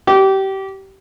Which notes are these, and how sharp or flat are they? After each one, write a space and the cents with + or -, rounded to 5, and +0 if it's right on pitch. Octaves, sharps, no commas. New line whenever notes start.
G4 -25